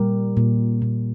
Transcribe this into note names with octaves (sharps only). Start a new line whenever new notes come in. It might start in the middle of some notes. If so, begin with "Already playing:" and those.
Already playing: A#2 G3 G4 A#4
A#2
A#2